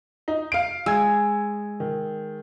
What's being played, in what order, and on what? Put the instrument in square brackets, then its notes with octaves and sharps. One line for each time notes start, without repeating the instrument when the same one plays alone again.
[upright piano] D#4
F5 D7
[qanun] G#3 [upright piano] E6 G#6
[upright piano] D#3